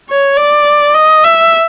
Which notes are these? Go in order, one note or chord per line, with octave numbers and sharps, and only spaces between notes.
C#5
D5
D#5
E5